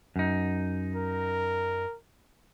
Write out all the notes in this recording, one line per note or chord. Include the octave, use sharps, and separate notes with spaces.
F#2 D#4
A#4